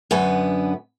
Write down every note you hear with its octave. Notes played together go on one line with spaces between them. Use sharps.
F#2 D3 B3 B4 G#5